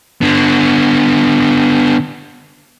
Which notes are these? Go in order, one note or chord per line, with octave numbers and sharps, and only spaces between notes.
D3 B3